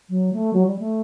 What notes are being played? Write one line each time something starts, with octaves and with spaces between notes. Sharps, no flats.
F#3
A3
F#3
G3
A3